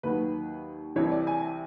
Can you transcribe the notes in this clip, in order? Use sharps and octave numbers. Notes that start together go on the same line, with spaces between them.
D#2 D#3 F#3 B4
C2 C3 E3 C#5
D5
G#5